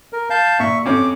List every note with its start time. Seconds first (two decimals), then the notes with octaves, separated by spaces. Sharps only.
0.13 A#4
0.30 F5 A5 G6
0.60 A#2 E5 C#6
0.86 F2 C4 C#4 D6